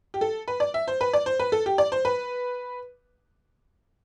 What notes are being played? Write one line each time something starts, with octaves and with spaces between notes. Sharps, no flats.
G4
A4
B4
D5
E5
C5
B4
D5
C5
B4
A4
G4
D5
C5
B4